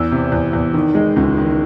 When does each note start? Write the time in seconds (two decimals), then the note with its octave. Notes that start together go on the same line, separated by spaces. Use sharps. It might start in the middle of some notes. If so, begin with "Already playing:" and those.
Already playing: E2 E6
0.11 C3
0.32 E2
0.53 E2
0.74 D#3
0.95 G#3
1.16 C#2
1.37 D#3